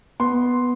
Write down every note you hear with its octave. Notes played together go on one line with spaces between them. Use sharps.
B3 C6